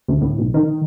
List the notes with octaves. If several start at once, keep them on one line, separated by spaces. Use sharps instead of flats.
D2
A2
B1
D#3